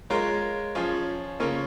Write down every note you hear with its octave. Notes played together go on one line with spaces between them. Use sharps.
G#3 F4 A#4 C#5
F3 C#4 F4 G#4 C#5
C#3 A#3 C#4 F4 C#5